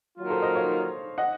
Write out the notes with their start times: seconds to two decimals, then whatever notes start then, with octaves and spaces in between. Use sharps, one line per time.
0.17 D#3 F#3 A#3 F4
0.30 A4 C5
0.42 C5 D#5
0.55 C#5 F5
1.18 D#5 F#5